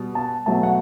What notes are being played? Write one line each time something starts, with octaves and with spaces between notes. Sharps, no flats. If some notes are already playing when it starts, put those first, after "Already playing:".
Already playing: B2 G3
A5
B2 F#3 A3 A5
F#5